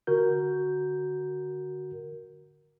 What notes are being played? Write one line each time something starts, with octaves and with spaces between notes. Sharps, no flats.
D3 F#4 A#4 G6